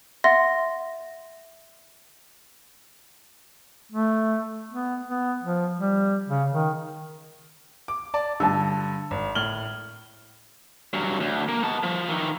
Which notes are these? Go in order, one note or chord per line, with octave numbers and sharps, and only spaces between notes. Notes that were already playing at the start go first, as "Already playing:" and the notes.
E5 F#5 C6 A6 A#6
A3
B3
B3
F3
G3
C#3
D#3
D6
D5 A5
G2 D3 A5 E6
G#1
A2 F6 F#7 G7
G2 F#3
D2
A#3
B3 A5
F3
D#3 E3